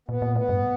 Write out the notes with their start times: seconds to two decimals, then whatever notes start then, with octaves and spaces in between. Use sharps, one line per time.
0.09 A#2 B3
0.22 A#2
0.36 A2 B3
0.49 G2